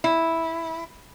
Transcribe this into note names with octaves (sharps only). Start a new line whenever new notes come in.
E4